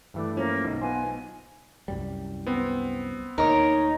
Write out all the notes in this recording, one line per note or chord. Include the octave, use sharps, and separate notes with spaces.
G2 E3 A3 D4
F3 A#3 C#4
B1
B3 F4 C5 G#5
C2 F#2 G3
B3 C4
D2 A#2 D#4 A#4 C#5